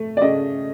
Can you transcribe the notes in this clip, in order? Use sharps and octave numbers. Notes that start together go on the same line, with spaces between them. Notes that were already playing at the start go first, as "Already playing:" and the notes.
Already playing: A3
D5
C#3 D#5